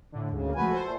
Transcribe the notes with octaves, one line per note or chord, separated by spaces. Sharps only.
A2 D3
D2 G#2 C#3
D2 D3 A#3
C#2 F3 A3 F#4 B4 G#5
A4 C5
A#2 A3